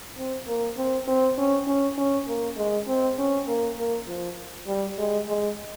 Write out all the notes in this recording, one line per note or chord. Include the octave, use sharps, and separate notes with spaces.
C4
A#3
C4
C4
C#4
C#4
C#4
A#3
G#3
C4
C#4
A#3
A#3
F3
G3
G#3
G#3